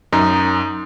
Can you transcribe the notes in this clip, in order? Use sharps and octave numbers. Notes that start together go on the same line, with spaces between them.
F#2 D#4